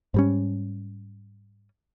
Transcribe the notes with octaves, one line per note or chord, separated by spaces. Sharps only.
G#2 G3 C#4